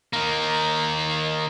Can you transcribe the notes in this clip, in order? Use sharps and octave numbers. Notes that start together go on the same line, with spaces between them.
D#3 A#3